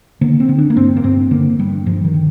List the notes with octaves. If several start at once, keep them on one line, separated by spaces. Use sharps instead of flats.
D3 A#3
C4
D3
D4
A#3
G2 C4
A#3
G2 C4
D3 A#3
G2 G3
G2 F3
D#3
D3